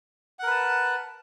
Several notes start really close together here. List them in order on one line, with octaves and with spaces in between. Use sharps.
F#5 A#4 B4 A5